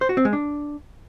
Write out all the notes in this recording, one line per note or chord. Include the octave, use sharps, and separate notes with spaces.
C5
F#4
C4
G#3
D4